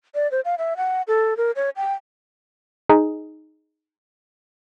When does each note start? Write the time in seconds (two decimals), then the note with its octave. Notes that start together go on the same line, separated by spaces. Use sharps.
0.15 D5
0.31 C5
0.45 F5
0.58 E5
0.77 F#5
1.08 A4
1.37 A#4
1.56 C#5
1.76 G5
2.89 D#4 G#4